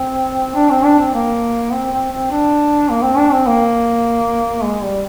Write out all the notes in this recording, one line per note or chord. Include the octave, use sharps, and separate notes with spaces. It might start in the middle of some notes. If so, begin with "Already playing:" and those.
Already playing: C4
D4
C4
D4
C4
A#3
C4
C4
C4
D4
A#3
C4
D4
C4
A#3
G#3
G3